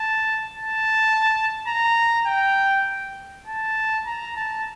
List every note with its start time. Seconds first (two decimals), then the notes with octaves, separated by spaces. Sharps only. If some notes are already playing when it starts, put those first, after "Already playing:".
Already playing: A5
0.48 A5
1.67 A#5
2.27 G5
3.47 A5
4.07 A#5
4.36 A5